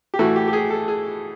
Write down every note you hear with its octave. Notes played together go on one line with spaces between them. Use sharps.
G4
A2 E3 A3 F#4
G4
G4
G#4
A4
G#4